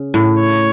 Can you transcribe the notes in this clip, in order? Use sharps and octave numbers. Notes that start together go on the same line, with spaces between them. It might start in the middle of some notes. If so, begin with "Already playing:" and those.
Already playing: C#3
A2
C#5